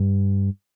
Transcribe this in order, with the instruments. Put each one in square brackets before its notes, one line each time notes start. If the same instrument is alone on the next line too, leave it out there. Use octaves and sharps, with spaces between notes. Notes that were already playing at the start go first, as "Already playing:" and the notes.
Already playing: [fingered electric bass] G2